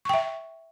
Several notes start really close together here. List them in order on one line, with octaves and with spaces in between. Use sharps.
C#6 G5 E5